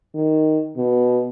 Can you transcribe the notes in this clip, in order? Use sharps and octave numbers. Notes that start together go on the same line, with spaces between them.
D#3
B2